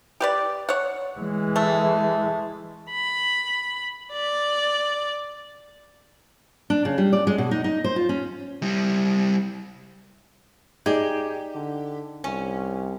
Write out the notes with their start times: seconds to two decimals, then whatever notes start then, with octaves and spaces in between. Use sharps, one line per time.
0.20 G4 B4 D5
0.69 C#5 F#5
1.20 E3 G#3
1.56 A3 A4
2.91 B5
4.12 D5
6.70 D4
6.85 C#3
6.98 G3
7.13 D5
7.27 G#3
7.38 B2
7.51 D#4
7.64 D#4
7.84 C5
7.96 F4
8.09 C#4
8.62 G3 E4
10.86 D#4 G4 G#4 D5
11.55 D3
12.24 C2 C#4